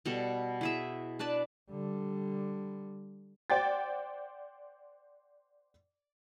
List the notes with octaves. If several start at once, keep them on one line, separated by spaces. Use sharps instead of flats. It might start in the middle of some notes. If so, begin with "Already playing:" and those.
B2 G3 A4
E4 G#4 E5
D4 B4 D5 A5
D3 G3
C5 D5 F#5 G5 A6